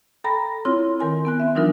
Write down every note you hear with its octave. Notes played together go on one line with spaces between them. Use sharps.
A4 G5 A#5 B5 A#6
C4 E4 F4 C#5 C6
D#3 A#4 G#5 C6
B3 G#5 F#6
C4 E5
E3 F#3 D4 D#4 F4 A#4